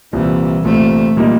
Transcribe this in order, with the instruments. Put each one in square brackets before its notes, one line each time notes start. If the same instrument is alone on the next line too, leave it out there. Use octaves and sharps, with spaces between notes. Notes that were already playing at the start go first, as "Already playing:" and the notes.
[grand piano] C2 A#2 G3 C4 [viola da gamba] E3
[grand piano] C2 A#2 G3 C4 [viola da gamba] A3
[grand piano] A#2 G3 A#3 D#4